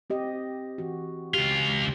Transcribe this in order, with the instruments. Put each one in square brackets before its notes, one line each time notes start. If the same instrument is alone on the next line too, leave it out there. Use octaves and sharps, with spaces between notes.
[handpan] C4 G4 D#5
E3 F#4
[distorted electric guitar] C#2 F4 [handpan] G4